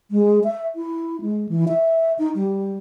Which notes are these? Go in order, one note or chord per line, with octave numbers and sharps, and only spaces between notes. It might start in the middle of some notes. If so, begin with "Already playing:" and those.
G#3
E5
E4
G#3
E3
E5
D#4
G3